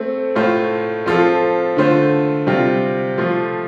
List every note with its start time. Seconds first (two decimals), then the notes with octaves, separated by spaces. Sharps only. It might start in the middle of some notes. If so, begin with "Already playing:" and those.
Already playing: A3 C4 A4
0.35 A2 A3 F4 C5
1.06 F3 C4 F4 A4
1.77 D3 A3 F4 C5
2.47 C3 G3 C4 F4
3.18 F3 A3 F4